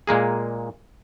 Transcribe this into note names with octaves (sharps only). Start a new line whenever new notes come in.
A#2 G#3 A#3 G#4